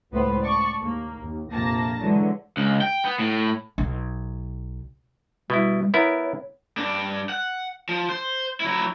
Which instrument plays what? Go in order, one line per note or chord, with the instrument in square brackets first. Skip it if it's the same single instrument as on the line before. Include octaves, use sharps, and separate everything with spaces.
[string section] C#2 A2 B3 B4 C5
D5 A5 C#6
D#2 A#3
D#2
A#1 F2 C3 A#3 A5 A#6
D3 E3 F#3 G#3
[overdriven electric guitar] C#2
G5
B3
A2
[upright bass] B1
[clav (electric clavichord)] B2 E4 [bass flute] G3
[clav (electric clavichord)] B3 E4 A#4 [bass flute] C#5
[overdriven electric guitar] G2 D4
F#5
F3
C5
F#3 E4